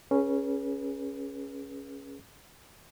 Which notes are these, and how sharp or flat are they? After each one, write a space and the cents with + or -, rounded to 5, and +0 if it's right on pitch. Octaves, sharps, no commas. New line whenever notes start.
C#4 +0 G#4 +0 B4 -40